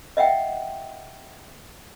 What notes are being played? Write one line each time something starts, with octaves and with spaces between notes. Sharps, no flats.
D#5 E5 F#5 G5